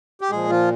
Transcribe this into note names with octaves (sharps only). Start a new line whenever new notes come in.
G4
A#2 F3 G#3 G#4
F3 F4